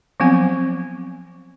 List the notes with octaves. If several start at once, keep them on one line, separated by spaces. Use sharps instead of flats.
F3 F#3 B3 C4 G#5